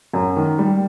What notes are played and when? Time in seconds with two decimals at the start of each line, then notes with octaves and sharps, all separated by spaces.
0.13 F#2
0.36 D#3
0.58 G3